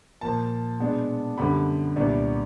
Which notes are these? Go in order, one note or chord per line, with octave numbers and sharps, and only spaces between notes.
A#2 F3 A#3 A5
B2 G#3 B3 D4
F#2 D3 G3 B3 B5
C2 A#2 G3 B3 D4